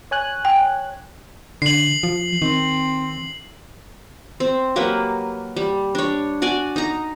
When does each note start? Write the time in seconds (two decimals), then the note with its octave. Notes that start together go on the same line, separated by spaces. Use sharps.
0.11 C#5 G#5 F#6
0.45 G5
1.62 D3 C7 F#7
2.03 F3
2.42 D#3 C4
4.40 C4
4.76 F#3 A#3 G4 B4
5.56 G3
5.95 D4 C#5
6.42 F#4 D5 G#5
6.76 D#4 A#5